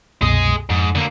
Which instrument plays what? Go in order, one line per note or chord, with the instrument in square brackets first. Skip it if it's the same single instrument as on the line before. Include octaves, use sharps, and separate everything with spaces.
[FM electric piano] C2 F#2 B2 [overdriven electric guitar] G#4 D#5
[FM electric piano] F2 [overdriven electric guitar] G#2
[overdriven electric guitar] D3 A#3